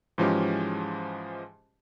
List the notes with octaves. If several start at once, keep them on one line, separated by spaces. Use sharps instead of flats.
G#2 E3 F3 G#3 C#4 G4